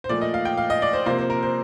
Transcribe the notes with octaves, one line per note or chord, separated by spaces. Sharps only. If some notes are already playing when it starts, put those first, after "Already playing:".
C5
A#2 F3 A3 D5
D#5
F5
G5
F5
D#5
D5
C5
C3 F3 A#3 C5
C5
A#4
C5